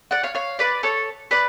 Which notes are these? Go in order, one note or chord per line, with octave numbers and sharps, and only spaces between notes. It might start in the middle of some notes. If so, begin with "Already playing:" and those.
D5 F#5
C#5 F5
C#5 F5
B4 D5
A4 C#5
B4 D5